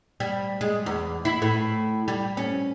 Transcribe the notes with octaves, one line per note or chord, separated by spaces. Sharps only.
G3
G#3
E2
E4
A2
G3
C#4